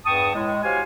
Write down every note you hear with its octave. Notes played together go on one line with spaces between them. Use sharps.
E2 G2 G5 A5 C#6 D#6
A2 G#3
F#4 G4 C5 C#5 F5 G#5